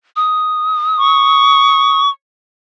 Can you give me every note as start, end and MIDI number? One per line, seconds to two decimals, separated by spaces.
0.16 2.01 87
0.98 2.09 85